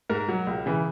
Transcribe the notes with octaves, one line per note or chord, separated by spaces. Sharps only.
G#2 A#4
F#3
C#2
C#3 E3